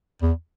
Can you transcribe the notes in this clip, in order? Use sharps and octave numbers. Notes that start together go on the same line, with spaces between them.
E2